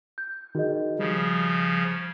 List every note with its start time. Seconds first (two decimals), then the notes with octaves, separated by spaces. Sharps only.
0.18 G6
0.55 D#3 F#4 G#4 D#5
0.99 C#3 F3 G3